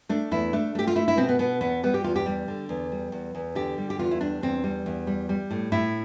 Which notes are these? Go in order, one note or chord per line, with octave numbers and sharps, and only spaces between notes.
A3 D4
E2 E4
A3 D4
A3 G4
F4
A3 E4
E4
B2 C4
B3
B2 B3
E2 B3
G3 B3
G4
E2 F4
G4
G3
D3
E2
G3
E2
E2
D3 G4
G3
G4
E2 F4
E4
G3 D4
E2 C4
G3
E2
G3
G3
A2
A2 E4